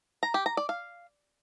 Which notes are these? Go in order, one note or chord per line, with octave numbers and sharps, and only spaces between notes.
A#5
G4
A#5
D5
F5